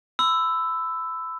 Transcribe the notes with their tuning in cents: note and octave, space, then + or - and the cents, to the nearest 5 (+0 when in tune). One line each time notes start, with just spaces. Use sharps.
B5 +35 E6 +0